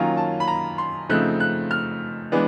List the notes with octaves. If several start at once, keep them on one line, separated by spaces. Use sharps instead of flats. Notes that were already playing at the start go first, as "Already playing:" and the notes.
Already playing: D#3 F#3 A#3 C#4 F4 A#5
A5
B5
A#5
C6
C#3 F3 A3 C4 D#4 F#6
F#6
F6
E3 G#3 B3 D4